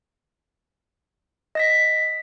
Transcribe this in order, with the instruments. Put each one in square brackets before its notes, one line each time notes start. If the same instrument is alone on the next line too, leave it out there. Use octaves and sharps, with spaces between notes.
[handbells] D#5 A#6 B6